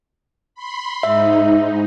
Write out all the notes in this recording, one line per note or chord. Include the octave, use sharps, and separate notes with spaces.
B5 C6
G#2 D#4 E5